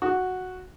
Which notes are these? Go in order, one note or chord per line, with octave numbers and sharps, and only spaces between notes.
F#4